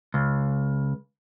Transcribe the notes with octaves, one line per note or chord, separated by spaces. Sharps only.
C#2